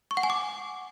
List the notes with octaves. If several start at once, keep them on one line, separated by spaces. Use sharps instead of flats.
C#6
F#5
G#5
D6